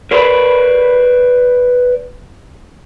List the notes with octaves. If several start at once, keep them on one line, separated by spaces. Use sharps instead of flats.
A#4 B4 C#5 D5 B5